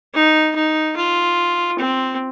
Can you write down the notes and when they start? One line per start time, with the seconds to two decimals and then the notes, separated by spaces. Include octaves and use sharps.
0.14 D#4
0.55 D#4
0.96 F4
1.78 C4